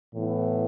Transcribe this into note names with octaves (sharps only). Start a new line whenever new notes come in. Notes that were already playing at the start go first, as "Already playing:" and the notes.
A2 E3 B3 E4